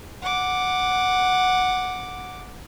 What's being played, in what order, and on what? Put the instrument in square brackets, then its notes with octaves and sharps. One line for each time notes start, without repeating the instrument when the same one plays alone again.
[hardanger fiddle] F#5 D6